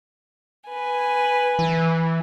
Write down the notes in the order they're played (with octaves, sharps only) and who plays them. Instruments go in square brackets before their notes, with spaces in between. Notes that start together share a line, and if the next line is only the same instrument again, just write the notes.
[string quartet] B4 G#5
[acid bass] E3